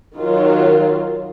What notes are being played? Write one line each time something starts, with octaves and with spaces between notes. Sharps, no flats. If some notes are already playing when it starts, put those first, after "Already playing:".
D#3 F#3 F4